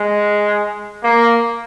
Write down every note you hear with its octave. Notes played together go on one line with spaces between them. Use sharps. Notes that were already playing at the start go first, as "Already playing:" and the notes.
Already playing: G#3
A#3